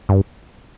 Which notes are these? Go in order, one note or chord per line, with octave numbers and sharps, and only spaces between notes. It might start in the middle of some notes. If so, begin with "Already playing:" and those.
G2